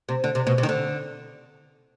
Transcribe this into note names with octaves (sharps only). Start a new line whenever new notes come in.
C3
D3
C3
B2
C3
D#3
D3